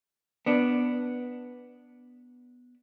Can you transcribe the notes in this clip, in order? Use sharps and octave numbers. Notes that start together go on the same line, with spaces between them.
B3 D4